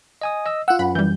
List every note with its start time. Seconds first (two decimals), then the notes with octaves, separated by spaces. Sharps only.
0.21 D#5 G#5 D#6
0.46 D#5 E6
0.68 F4 F#5 E6 F#6
0.79 F#2 B5
0.95 E3 G3 G6